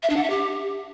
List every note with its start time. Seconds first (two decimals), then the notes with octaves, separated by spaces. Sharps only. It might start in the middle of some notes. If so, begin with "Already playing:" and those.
0.03 E5
0.10 D4
0.16 F#5
0.23 E5
0.30 G4